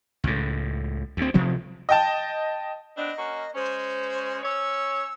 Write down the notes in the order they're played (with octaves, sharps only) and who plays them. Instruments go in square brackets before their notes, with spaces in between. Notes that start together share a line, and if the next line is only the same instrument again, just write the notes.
[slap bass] C#2 A2
D2 C4
C3 F3 F#3 C4
[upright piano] D#5 G5 A5
[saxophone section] B3 C4 D4 [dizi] D#5
[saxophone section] A#3 C#4 F#4
[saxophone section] G#3 C#4 [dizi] C5
[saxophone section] C#4 C#5 [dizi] E6